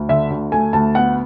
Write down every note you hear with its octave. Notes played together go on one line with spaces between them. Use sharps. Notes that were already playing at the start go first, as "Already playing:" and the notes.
Already playing: D2
D3 E5
D2
A3 G#5
D2 A5
B3 F#5